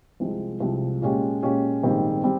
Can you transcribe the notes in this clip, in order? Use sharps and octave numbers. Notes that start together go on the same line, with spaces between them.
C2 C3 F3 G#3
C2 C3 F3 G#3
A#2 G#3 C#4 G4
A#2 G#3 C#4 G4
A#1 G#2 D#3 G3 C4
G3 C4